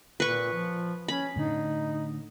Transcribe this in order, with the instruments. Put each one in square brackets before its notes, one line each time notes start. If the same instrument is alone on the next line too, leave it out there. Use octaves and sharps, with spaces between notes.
[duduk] A#2 [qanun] B4 C#6
[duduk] F3
[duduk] C#4 [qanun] B5
[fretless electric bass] A2 D3 [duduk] D#4